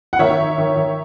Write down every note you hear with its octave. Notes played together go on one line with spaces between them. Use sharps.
F#5
D#3 C#5 E5
D#3
D#3
D#3